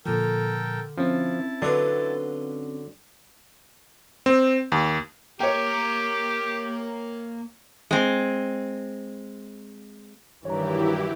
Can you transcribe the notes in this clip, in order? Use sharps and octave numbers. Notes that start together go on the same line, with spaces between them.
A#2 D3 F3 A4 A#4 G5
F3 C4 C#4 E4 A5
D3 F#3 D4 D#4 F4 B4
C4
D#2
A#3 G4 A#4 C#5 G5
G#3 C4
G2 D#3 E3 F#3 E4 G4 C#5 A#5